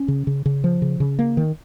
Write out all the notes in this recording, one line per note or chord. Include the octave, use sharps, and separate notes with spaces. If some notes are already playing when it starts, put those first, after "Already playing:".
Already playing: C#4
C#3
C#3
C#3
F3
C#3
C#3
A#3
D#3